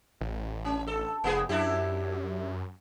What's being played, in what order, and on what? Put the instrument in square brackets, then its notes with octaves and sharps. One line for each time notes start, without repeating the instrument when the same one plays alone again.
[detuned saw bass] A1
[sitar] C#4
A4
[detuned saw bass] F1 [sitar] A#3 B3 G#4
[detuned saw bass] F#2 [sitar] D4 E4 G4